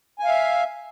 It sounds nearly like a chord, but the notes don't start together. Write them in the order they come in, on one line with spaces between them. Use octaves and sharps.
G#5 F5 E5